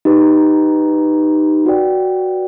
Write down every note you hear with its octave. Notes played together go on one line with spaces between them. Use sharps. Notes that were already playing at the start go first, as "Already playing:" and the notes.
D#4 G4 B4
F#4 B4 D5 G5